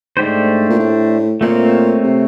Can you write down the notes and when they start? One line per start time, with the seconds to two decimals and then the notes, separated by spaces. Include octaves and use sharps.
0.17 G#2 A3 D4 G4 C5
0.70 A#2
0.79 A2
1.41 A#2 A3 C4 F4 A#4 C#5
2.04 C3